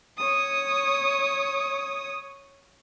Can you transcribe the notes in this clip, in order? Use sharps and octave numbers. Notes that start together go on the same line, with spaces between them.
C#5 D#6